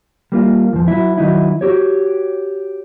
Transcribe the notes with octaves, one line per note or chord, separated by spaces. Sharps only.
G3 A#3 F4
E2 F3
F#3 E4
D#3 F#3 D#4 E4
F#4 G4 C#5